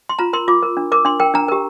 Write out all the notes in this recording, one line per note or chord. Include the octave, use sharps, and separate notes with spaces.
C6
F4 A#5
A#4 C6
F4 D6
A#4
D4
A#4 D6
D4 C6
A#4 G5
D4 A#5
G4 A#4